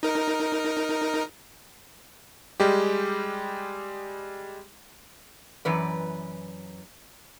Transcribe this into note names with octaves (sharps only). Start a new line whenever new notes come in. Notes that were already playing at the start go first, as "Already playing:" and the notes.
D#4 A#4
G3 G#3 G4
F#2 E3 B4 D5